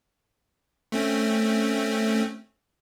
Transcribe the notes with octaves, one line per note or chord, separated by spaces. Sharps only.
A3 C4 C#4